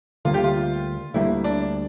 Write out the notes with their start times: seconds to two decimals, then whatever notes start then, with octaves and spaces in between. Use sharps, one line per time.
0.25 D2 D3 G3 A#3 F4
0.34 G4
0.44 F4
1.14 D2 D3 G3 A#3 E4
1.44 D4